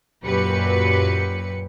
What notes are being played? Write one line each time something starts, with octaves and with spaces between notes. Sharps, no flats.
F#2 A#2 F#3 G4 B4 C#7